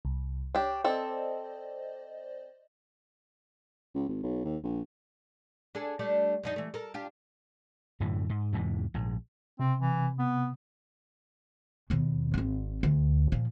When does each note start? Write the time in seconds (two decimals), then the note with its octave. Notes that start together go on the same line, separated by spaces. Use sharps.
0.05 C2
0.55 D4 G4 C#5
0.84 C4 A4 C5 D5 D#5
3.94 C#2
4.09 G#1
4.23 B1
4.44 D#2
4.63 A#1
5.75 D4 G#4 A4
5.99 G3 A3 D4
6.43 F2 D4 D#4
6.56 E3 A3
6.74 A4 A#4
6.94 D4 F4 G4
8.00 F#2 A2 D3 E3
8.30 G#2
8.53 E2 G#2 C3 E3
8.94 A#1 G#2
9.60 C3 C4
9.80 E3
10.19 B3
11.90 D#2 B2
12.34 G#1 C4
12.83 D2
13.32 A#2 F3